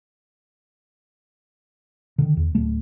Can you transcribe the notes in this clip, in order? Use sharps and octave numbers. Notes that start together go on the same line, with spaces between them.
D3 D#3
E2
D1 A3